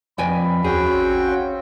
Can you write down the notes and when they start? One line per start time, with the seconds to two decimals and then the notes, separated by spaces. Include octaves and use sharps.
0.18 F2 B4 D5 G5 G#5 B5
0.64 D#2 C#4 F#4 G#4 G5
0.93 A1 C4
1.28 C#5 F5